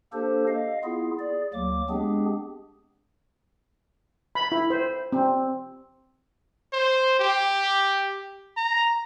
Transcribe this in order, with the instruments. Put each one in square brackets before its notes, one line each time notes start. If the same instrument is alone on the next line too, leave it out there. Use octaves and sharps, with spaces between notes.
[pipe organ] A#3 D4 G4 A4 C5
D#5 F5
B3 E4 F4 G#4
G#4 D5
D2 F#3 A#3 D6
G#3 B3 C4 D4 G4 G#4
[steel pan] B5
E4
C5
C4
[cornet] C5
G4
A#5